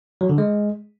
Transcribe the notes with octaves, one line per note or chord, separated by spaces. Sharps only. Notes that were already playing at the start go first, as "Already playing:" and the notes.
F#3
D3
G#3